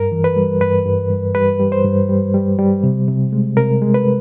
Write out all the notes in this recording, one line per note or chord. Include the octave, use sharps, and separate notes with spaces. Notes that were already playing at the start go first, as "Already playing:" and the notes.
Already playing: G2 A#4
E3
B4
G3
G2 B4
G2
G2
G3 B4
G3
C5
G2
G3
G3
G3
C3
C3
G#3
C3 A#4
G#3
B4